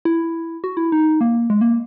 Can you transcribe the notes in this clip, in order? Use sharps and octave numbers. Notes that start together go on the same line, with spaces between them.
E4
F#4
E4
D#4
A#3
G#3
A#3